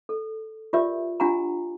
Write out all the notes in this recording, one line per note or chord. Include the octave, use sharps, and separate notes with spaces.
A4
F4 G4 A#4 D5 E5
D4 F4 G4 F#5 G#5 A#5